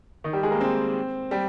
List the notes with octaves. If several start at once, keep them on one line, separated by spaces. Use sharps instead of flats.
D#3 D#4
G3 G4
G#3 G#4
A#3 A#4
C4 C5
G3 G4